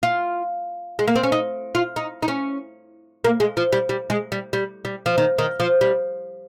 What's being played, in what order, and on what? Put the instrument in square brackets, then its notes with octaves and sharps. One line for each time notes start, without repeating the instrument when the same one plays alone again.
[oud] F4
G#3
A#3
C4
C#4
D#4
F4
D#4
D#4
C#4
A#3
G#3
F3
G3
G3
G#3
G3
G3
G3
F3
D#3
D#3
F3
G3